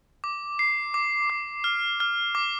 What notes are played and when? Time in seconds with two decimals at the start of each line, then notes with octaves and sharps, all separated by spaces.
0.24 D6
0.59 C7
0.94 D6
1.30 D6
1.64 F6
2.00 F6
2.35 D6